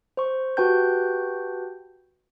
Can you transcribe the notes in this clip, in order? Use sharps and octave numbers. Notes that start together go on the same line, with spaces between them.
C5 C#6
F#4 G4 B4 G5 A5 G6